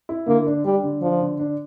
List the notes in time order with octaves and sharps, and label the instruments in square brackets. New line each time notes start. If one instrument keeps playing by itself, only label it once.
[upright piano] E4
[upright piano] D3 [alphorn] A#3
[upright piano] D4
[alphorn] G3 [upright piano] D4
[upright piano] D3
[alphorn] F3 [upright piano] D4
[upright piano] D3
D4